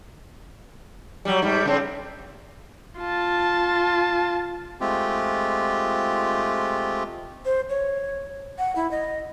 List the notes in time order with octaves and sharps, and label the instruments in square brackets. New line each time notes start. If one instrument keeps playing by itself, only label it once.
[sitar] F#3 G3
G#2 G3
C#3 C4
[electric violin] F4 A5
[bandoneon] G#3 A3 C4 F4 G4
[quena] C5
C#5
F#5
E4
D#5